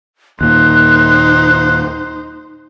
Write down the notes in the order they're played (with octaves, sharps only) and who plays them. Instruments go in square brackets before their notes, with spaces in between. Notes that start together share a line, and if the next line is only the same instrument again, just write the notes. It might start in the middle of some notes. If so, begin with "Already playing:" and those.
[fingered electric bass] D#2 A#2 [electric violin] D#4 C5 [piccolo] F#6